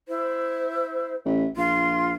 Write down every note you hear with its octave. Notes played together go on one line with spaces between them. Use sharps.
E4 C5
A1 E5
A#1 F4 C6